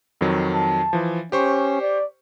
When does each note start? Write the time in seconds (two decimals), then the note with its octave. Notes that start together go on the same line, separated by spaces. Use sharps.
0.21 F2 D#3 F#3
0.53 A5
0.93 E3 F3
1.32 C#4 G4 C5 C#6
1.81 D5